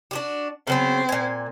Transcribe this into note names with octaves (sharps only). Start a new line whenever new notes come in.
D4 F#4 G4
C#3 F#3 B3 C4
A#2 G#5